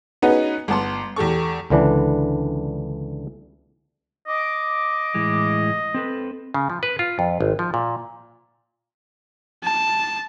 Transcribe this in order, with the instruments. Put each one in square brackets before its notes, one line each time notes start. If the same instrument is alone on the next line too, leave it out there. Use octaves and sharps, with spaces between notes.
[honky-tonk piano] B3 C#4 D#4 F#4 G#4 B4
G1 B3 A5 C6
E2 G4 A4 C#6
[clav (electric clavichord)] C#2 D3 E3 D4
[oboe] D#5 [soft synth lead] D6
[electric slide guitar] A2 E3 G#3
C4 A4 B4
[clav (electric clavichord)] C#3
F3
B4
F4
F2
G#1
F3
A#2
[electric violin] A5